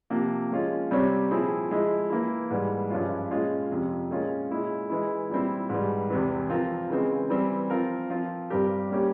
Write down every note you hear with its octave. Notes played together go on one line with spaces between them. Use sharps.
C3 F3 A#3
F3 G#3 C#4 F4
C3 G3 C4 G4 C#5
A#2 F3 C4 E4 G#4
F3 G#3 E4
E3 A#3 E4
G#2 E3 G3
G2 F3 G#3 C#4 F4
A#2 G#3 C#4 F4
F2 C3 F3
A#2 G#3 C#4 F4 A#4
A#2 G#3 E4
E3 G#3 E4
A#2 G3 C4 E4
G#2 E3 G3
E2 C3 E3
F3 C4 F4 A#4
C#3 E3 G#3 C4
E3 G3 C4
F3 C4 F4 A#4
F3 C4 F4
G2 G3 C4 G4 A#4
G3 A#3 C#4 G4